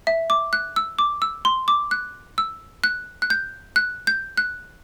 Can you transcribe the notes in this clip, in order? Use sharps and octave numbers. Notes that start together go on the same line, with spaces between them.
E5
D6
F#6
E6
D6
E6
C6
D6
F#6
E6
F#6
F#6
G6
F#6
G6
F#6